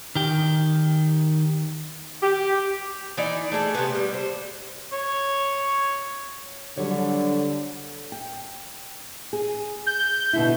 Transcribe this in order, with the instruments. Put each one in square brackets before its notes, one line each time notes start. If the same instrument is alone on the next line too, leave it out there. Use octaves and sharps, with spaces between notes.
[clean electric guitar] D#3 G4
[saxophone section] G4
[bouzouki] E3 D#4 D5
A3 D4 G#4 A4
C3 B3
G3
C5
[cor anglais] C#5
[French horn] D3 [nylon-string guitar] F#3 G3 C#5
[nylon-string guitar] G5
G#4
[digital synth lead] G6
[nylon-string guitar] B2 D3 E4